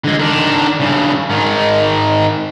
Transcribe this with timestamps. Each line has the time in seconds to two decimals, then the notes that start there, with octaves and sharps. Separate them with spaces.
0.04 D3 G#3
0.19 D#3 D4
0.80 G2 C#3
1.30 G#2 D#3